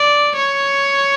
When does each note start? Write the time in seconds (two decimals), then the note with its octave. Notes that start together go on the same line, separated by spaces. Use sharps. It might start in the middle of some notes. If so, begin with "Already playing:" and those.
Already playing: D5
0.36 C#5